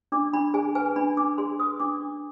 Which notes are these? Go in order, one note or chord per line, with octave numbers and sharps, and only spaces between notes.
D4 D6
D4 B5
G#4 G#5
B4 G#5
D4 B5
D4 D6
G#4 C6
B4 D#6
D4 D6
D4